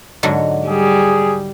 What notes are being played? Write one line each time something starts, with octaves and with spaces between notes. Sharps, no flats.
G#2 D3 F#3
G3 G#4